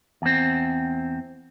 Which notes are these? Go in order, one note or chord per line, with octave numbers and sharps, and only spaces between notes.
E2 C4